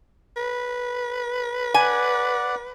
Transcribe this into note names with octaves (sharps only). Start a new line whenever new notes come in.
B4
D5 F#5 G#5